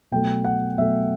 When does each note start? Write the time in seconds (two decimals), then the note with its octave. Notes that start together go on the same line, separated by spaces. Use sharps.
0.12 B2 F#3 A3 G5
0.44 F#5
0.78 B2 F#3 A3 E5